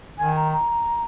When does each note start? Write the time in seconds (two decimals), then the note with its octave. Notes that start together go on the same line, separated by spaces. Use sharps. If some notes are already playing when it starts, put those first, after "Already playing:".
0.18 D#3 G#5
0.36 A#5
0.52 A#5